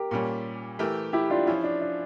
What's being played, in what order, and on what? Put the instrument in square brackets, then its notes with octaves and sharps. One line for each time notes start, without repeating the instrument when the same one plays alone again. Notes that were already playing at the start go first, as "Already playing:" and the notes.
Already playing: [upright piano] G4 A#4
[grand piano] A#2 G3 C#4
E3 A3 E4 G4 A#4
[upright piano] E4 G4
D4 F4
[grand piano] F3 C#4 F4 [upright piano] E4
[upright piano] D4
D4